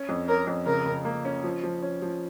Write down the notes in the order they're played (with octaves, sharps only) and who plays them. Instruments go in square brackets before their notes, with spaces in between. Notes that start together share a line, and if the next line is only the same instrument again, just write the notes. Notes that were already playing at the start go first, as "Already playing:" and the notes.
Already playing: [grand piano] C#4
F2
[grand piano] C#4 [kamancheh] A#4
[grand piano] F2
[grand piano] C#3 [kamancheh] A#4
[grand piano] C#3
A#3
C#4
F3
F3
C#4
F3